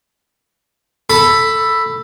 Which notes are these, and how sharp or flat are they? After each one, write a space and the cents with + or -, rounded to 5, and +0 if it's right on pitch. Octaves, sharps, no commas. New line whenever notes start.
A4 +5 B5 +0